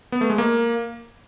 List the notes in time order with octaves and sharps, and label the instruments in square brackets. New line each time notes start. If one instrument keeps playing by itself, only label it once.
[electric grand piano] B3
A3
G#3
A#3